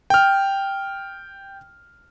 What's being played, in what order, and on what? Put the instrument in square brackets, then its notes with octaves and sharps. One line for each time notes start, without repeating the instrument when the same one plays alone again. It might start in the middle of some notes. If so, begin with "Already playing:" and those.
[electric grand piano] G5 F6